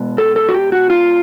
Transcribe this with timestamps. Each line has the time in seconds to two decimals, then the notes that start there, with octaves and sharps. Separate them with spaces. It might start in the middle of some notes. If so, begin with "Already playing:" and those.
Already playing: B2 G#3 B3
0.18 A4
0.36 A4
0.49 F#4
0.54 G4
0.72 F#4
0.90 F4